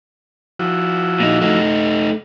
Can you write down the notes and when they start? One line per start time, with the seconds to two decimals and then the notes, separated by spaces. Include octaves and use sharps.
0.59 F3 E4 F#4
1.20 A#2 D#4
1.41 A3 D#4